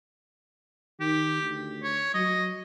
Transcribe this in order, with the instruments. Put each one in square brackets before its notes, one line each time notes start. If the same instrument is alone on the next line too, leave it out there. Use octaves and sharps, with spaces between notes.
[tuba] D#3 [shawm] G4
[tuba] D2
[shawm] C#5
[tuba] F#3 [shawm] D#5